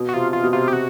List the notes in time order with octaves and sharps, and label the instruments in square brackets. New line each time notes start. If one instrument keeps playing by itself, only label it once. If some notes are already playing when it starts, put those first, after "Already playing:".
Already playing: [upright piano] B2
[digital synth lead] F#4
[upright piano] C3 [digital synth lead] F4
[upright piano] C3 [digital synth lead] F4
[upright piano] B2
[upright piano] C3 [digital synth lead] F4
[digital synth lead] G4
[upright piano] B2 [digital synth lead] F#4